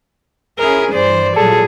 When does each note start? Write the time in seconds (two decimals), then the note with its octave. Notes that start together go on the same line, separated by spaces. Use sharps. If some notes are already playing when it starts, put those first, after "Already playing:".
0.59 C#4 E4 G#4 A#4
0.93 G2 E3 C5 D5
1.36 A#2 F#3 G3 G#4 A4